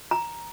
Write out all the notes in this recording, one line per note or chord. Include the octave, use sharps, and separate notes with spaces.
A#5